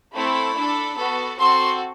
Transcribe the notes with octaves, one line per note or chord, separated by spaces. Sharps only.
A3 C4 E4 A4 B5
D4 A4
B3 F#4 A4
C4 F#4 A4 C6